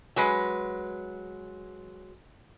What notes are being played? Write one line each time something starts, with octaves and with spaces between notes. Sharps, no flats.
F#3 G#3 B4